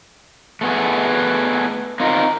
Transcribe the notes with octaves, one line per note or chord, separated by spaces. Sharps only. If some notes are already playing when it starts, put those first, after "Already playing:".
A3 B3 G#4
C4 D#4 F4 A#4